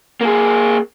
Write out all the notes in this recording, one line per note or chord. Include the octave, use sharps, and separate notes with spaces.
A#3 G#4